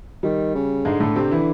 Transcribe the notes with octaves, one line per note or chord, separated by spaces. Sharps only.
D#3 G3
C#3
G#2 D3 G#3
A2 A3
C3 C4
E3 E4